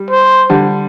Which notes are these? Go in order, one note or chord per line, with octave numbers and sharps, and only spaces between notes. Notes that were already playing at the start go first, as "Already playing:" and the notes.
Already playing: G3
C5
D3 G3